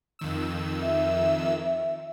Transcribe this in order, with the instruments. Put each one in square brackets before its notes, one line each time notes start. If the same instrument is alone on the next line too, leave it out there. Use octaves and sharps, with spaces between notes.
[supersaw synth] F2 D#3 E6
[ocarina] E5